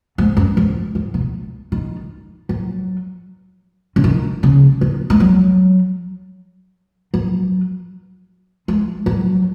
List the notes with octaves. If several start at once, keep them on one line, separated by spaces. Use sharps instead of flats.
G#2
F#2
G#2
G#2
B2
D#3
F#3
C#3
D#3
C#3
D#3
G#3
F#3
F#3
G#3
F#3